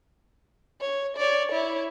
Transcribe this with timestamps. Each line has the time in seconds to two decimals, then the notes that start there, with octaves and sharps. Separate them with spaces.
0.81 C#5
1.17 C#5 D5
1.51 E4 C#5